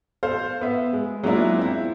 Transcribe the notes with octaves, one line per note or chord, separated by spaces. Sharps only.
A4 C5 F5
B3 E5
G#3
F#3 G#3 A#3 D4 E4 F4
C4 E4